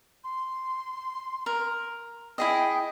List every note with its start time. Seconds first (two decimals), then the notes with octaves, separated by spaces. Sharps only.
0.24 C6
1.46 A#4
2.38 E4 G#4 D#5 G5